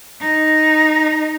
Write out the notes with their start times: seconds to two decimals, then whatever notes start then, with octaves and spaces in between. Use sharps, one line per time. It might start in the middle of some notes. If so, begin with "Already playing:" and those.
0.21 D#4